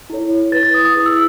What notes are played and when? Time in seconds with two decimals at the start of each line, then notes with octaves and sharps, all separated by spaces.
0.10 E4 A4 C#5
0.52 B4 A6
0.56 E4
0.63 A6
0.74 D#6
0.85 D#6
0.95 E4 G#4 B4 D#6
1.06 E6